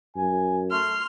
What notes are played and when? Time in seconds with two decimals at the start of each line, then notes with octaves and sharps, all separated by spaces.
0.16 F#2 G#5
0.71 A3 C6 F6